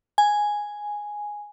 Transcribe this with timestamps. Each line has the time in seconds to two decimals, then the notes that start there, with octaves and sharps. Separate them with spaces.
0.18 G#5